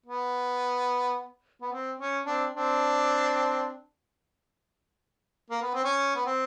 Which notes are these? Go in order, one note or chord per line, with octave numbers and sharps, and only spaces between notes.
B3
B3
C4
C#4
C4 D4
C4 D4
A#3
B3
C4
C#4
B3
C4